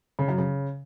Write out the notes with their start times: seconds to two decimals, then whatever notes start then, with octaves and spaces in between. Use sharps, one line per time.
0.19 C#3
0.28 F#2
0.38 C#3